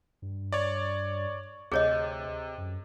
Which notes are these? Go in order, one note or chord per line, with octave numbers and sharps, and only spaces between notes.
G2
C#5 D5
D2 C3 G#4 C#5 D#5
F#2